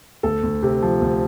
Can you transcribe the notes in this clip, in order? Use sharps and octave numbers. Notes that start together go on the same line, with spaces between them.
D2 A4
D2
C3
F3
D2